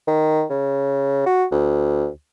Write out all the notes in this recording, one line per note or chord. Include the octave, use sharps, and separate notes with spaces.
D#3
C#3
F#4
D2